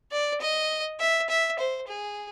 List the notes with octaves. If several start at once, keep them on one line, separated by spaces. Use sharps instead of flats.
D5
D#5
E5
E5
C5
G#4